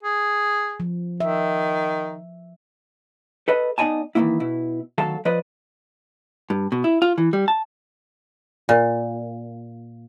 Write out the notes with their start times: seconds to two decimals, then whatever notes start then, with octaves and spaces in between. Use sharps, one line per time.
0.03 G#4
0.80 F3
1.20 D#3 E5
3.48 A4 B4 D#5
3.78 B3 D#4 D5 D#5 G#5 A5
4.15 D#3 E3 F#3 G#3 A#3 E4
4.40 B2 E4
4.98 D2 D#3 F#3 A4 F5 A5
5.25 F3 B4 D5 D#5
6.50 G2
6.72 B2
6.84 E4
7.02 F4
7.18 E3
7.33 G3
7.48 A5
8.69 A#2